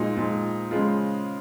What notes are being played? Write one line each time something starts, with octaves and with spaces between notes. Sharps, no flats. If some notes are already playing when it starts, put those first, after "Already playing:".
Already playing: A#2 F3 G#3 D#4
A#2 F3 G#3
C#3 F3 G#3 F4